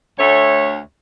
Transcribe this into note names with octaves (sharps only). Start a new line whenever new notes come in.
D2 A3 C#5